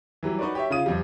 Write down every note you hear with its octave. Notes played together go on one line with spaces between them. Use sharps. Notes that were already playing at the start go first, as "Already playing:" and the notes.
E3 F#3 G3
D#4 F#4 B4 C#5 D5
G4 C#5 E5
C#3 F4 D#6 D#7
F2 G3